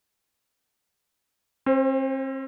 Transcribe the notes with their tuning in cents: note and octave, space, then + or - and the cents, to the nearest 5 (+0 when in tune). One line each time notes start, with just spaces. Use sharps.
C4 +40 C5 +0